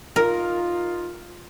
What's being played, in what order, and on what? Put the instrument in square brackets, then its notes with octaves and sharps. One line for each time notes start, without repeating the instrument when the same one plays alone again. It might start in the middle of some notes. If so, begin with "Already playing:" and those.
[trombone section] D#4 F4 [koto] A#4